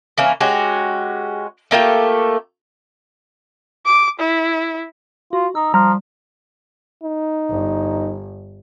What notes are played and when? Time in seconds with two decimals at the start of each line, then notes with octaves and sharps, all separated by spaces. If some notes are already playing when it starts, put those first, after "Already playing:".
0.18 E3 A#3 C#4
0.40 G#3 C#4 F#4 G4
1.71 A3 A#3 F4 G4
3.85 D6
4.20 E4
5.33 F4 F#4
5.55 D#4 E6
5.74 F3 G3 A#5 F6
7.04 D#4
7.49 G1